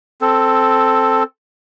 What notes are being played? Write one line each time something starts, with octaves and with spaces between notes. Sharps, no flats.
C4 A4